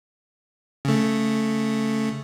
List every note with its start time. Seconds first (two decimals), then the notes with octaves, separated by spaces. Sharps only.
0.85 C#3 A3